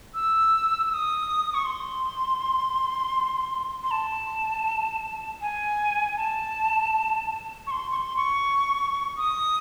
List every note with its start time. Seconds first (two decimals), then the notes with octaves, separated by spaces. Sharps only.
0.15 E6
0.90 E6
0.94 D#6
1.54 C#6
1.66 C6
3.83 C6
3.91 A5
5.41 G#5
6.17 A5
7.67 C#6
7.71 C6
7.92 C#6
7.96 C6
8.17 C#6
9.17 D#6